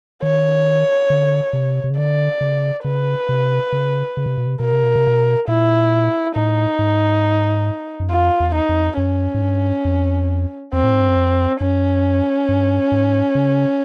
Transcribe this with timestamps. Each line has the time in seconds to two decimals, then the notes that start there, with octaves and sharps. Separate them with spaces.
0.22 D#3 C#5
1.10 D3
1.53 C3
1.84 C3
1.90 C#3
1.97 D3 D5
2.41 C#3
2.84 C#3 B4
3.29 C3
3.72 C#3
4.17 C#3
4.26 C3
4.37 B2
4.47 C3
4.60 B2 A#4
4.72 C3
4.84 B2
4.96 C3
5.07 B2
5.48 A#2 E4
6.35 A2 D#4
6.79 G#2
8.00 F#2
8.10 F2 F4
8.40 E2
8.54 D#4
8.69 F2
8.97 F#2 C#4
9.34 G#2
9.42 G2
9.85 F2
10.73 E2 C4
10.84 A2
10.93 G#2
11.00 G2
11.08 F#2
11.16 F2
11.60 F#2 C#4
12.49 G2
12.92 G#2
13.35 C#3